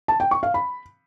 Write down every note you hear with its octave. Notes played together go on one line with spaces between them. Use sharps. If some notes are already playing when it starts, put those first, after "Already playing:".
A5
G5
C#6
F5
B5